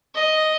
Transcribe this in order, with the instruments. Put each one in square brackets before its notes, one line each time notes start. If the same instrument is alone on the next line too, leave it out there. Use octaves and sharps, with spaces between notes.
[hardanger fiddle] D#5